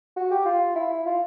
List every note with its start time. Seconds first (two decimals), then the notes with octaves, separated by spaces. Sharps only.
0.17 F#4
0.31 G4
0.45 F4
0.75 E4
1.06 F4